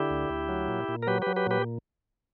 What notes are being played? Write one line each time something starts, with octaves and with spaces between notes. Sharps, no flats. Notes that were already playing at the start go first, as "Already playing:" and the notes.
Already playing: D3 E4 G4
D2
D2
F#3
A#2
A#2
A#4
F#3 G4 B4
F#3 G4 B4
G4 B4
A#2 G4 B4